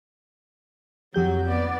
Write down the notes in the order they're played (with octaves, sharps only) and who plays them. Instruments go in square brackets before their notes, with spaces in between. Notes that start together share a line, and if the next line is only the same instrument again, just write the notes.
[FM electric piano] F2 G4 G6 [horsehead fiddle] F#3 F#4
[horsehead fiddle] B3 D5